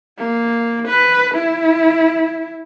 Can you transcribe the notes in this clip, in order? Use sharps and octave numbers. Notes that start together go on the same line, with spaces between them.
A#3
B4
E4